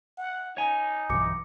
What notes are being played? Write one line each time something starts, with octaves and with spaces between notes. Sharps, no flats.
F#5
D#4 C#5 G#5
B1 G2 E3 D6 C#7